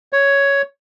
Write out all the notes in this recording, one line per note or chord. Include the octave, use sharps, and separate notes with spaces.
C#5